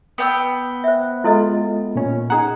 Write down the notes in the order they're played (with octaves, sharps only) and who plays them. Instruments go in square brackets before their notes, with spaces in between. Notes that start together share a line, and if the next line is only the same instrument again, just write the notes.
[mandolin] B3 G5 E6
[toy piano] C5 E5
[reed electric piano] G#3 F4 [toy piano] E4 A4 D#5
[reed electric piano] A#2 C#4
[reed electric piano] D#4 G#4 F#5 [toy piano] A#5